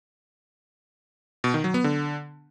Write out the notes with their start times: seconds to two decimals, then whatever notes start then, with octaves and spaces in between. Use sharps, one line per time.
1.44 B2
1.54 D#3
1.64 F#3
1.74 B3
1.84 D3